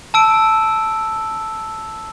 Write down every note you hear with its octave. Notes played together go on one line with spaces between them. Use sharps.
A5 E6 D7